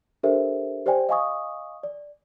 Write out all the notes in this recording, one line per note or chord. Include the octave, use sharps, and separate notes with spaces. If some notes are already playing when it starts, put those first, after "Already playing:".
D4 G4 A4 A#4 C5 E5
G4 C5 D5 G5 G#5
D#5 F5 G#5 C#6 D#6
D5